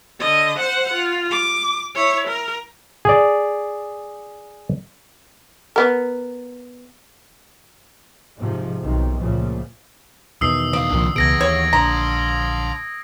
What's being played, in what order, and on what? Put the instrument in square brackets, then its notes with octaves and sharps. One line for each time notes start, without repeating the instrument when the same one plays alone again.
[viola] D3 D#5
C5 F#5
F4
D6
E4 C#5
A#4
[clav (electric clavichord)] G#4 D5
[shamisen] B3 A#4
[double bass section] G#2 C3 F3
B1 C3 D#3 F3
C#2 A#2 C#3 F3 A3
[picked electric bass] E2 B2 D#3 [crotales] D#6 E6 C7
[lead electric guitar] D2 F5 [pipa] D5
[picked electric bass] C2 A#2 F3 [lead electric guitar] D#3 D4
[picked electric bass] C#2 B2 [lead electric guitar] E3 G#4 [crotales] G#6 A#6 D7
[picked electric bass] D#2 [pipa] C#5 [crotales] G#6
[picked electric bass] A#1 D3 [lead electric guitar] A5 C6 [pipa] A#5